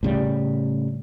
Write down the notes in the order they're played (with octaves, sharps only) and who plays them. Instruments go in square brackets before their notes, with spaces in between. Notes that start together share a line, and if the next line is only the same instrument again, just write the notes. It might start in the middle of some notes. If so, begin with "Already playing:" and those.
[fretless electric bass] A2 C#3 G3